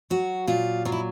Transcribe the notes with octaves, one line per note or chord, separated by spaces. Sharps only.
F#3 F#4
A#2 F4
F#3 F4
E4